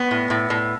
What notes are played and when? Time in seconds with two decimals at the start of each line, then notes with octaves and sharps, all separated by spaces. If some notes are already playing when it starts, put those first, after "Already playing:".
Already playing: B3
0.11 A2
0.30 A2
0.50 A2